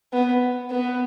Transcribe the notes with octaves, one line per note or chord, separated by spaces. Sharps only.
B3
B3